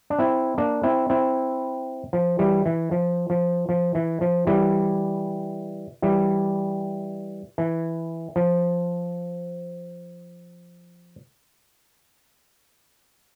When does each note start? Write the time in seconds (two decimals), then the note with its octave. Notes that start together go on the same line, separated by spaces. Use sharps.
0.10 D4
0.19 C4 E4
0.58 A#3 D4
0.83 C4 E4
1.10 C4 E4
2.13 F3
2.39 E3 G3
2.66 E3
2.91 F3
3.30 F3
3.69 F3
3.95 E3
4.21 F3
4.47 E3 G3
6.02 E3 G3
7.58 E3
8.36 F3